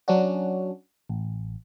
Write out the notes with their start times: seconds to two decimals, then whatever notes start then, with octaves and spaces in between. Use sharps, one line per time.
0.08 F#3 C#4 D4 F#4
1.09 A1